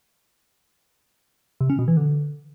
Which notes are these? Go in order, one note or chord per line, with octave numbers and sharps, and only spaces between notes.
C3
C#4
B2
E3
D3